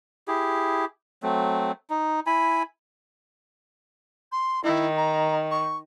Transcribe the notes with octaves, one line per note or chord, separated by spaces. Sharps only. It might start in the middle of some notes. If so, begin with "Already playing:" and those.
E4 G4 G#4
F#3 A3 C4
D#4
E4 G#5 B5
C6
D#3 E4
A#5
C#6